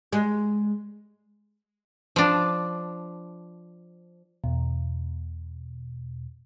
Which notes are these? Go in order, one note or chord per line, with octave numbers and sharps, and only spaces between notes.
G#3
F3 D4
E2 B2